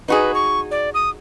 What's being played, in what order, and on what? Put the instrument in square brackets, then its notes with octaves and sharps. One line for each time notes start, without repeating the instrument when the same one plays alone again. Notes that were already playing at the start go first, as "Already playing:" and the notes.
[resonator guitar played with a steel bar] D#4 F#4 G#4 [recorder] B4
[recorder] C#6
D5
D#6